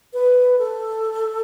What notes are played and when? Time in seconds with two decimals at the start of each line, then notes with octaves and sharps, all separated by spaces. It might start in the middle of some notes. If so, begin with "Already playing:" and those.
0.13 B4
0.59 A4